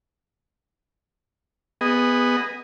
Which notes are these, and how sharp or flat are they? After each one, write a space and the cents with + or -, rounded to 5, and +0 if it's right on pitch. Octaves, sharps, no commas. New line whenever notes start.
B3 +0 G#4 -25 D#5 +0